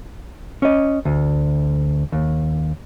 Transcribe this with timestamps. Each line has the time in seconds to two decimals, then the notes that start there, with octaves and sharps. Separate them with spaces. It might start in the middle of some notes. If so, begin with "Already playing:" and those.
0.62 C#4 D#5
1.05 D2
2.12 D#2